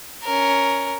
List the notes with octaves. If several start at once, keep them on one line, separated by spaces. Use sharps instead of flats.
C#4 A#4